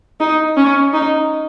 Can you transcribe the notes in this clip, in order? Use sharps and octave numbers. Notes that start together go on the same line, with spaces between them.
D#4
C#4
D#4